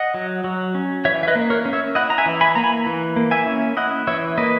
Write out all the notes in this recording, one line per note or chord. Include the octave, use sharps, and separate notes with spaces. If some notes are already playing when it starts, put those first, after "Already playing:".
Already playing: D#5 F#5
F#3
F#3
C#4
E3 C#5 E5
E5
B4 D#5
A#3
A#4 C#5
C#4
C#5 E5
E4 D#5 F#5
A#5
E5 G#5
E3
G#5 B5
A#3 A#5
G#5 B5
E3
A#3
E5 G#5
C#4
E4 D#5 F#5
E3 C#5 E5
A#3 B4 D#5